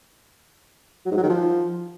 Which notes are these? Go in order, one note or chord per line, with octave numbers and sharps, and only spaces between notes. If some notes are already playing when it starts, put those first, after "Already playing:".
F#3
G#2
F#3
D#3
F3